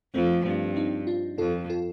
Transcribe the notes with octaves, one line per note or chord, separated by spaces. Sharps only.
F2 F3 A3 C4
G2 A3 C4
C4 D#4
D4 F4
F2 F4 A4
F4 A4